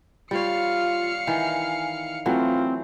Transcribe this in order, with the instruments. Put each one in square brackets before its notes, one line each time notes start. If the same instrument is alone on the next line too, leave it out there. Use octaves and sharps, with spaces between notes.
[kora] G3 C#5 [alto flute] F4 [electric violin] F5 C#7
[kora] D#3 E3 [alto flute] G#5
[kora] E3 F#3 A3 [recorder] C4 [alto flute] F4